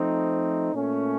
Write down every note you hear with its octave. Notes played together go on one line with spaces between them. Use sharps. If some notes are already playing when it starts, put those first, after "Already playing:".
Already playing: F3 A3 C4 D#4
A#2 A3 C#4